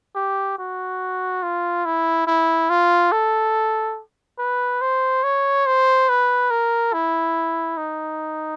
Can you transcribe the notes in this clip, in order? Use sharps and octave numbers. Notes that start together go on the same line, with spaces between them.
G4
F#4
F4
E4
E4
F4
A4
B4
C5
C#5
C5
B4
A#4
E4
D#4